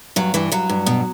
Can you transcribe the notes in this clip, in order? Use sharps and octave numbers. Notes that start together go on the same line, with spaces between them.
G2 F#3
G2 E3
G2 F#3
G2
B2